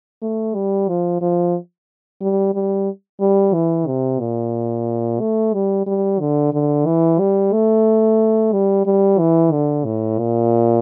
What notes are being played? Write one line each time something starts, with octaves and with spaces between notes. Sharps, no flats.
A3
G3
F3
F3
G3
G3
G3
E3
C3
A#2
A3
G3
G3
D3
D3
E3
G3
A3
G3
G3
E3
D3
A2
A#2